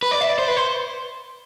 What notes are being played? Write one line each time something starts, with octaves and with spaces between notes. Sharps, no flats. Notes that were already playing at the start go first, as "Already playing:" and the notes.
B4
D5
E5
D5
C5
B4
C5